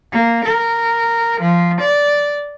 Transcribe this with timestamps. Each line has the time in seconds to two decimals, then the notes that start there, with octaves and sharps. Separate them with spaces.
0.12 A#3
0.45 A#4
1.40 F3
1.80 D5